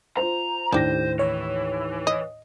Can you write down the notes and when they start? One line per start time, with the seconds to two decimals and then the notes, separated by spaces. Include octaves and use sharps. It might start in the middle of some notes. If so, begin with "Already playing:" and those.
0.17 F4 C5 A#5
0.72 D#2 A2 D4 G4 C5 A#6
1.19 E3 C#5
2.07 D#5